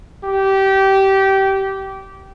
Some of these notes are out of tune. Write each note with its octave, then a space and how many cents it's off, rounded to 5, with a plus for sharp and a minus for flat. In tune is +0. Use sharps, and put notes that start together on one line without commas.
G4 -20